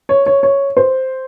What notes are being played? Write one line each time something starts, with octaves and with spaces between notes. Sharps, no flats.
C#5
C#5
C#5
C5